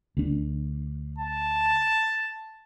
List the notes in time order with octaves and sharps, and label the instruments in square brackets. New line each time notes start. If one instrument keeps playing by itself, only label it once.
[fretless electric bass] D2 D4
[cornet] A5